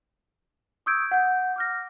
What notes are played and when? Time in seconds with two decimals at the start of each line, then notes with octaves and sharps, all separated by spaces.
0.86 C#6 D#6 E6 G6 G#6 D7
1.11 F#5 G6
1.56 D6 F6 A#6